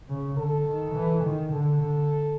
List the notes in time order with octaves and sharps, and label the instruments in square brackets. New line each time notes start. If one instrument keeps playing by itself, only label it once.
[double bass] C#3
[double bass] D3 [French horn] A4
[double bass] D#3
E3
D#3
[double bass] D3 [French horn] A4
[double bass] D3